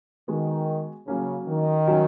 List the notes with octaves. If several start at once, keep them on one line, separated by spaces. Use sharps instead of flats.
D#3 G#3 B3 F#4
C#3 F#3 A#3 C#4
D#3
F#3 C#4 F#4